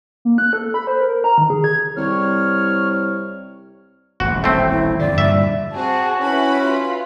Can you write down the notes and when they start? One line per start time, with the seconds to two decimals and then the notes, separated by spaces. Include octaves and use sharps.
0.25 A#3
0.38 F#6
0.53 A4
0.74 B5
0.87 C5
1.01 A#4
1.24 A#5
1.38 D#3
1.50 G#4
1.64 G#6
1.97 C2 C#5 F6
4.20 D#1 A1 F#4
4.44 A3 C4 E5
4.71 E4
4.99 F2 D3 D5
5.18 G2 A#2 D3 E5
5.74 C4 F#4 G#4 A5
6.20 C#4 E4 B4 B5
6.62 F4